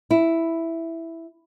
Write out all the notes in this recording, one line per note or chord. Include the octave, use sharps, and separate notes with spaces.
E4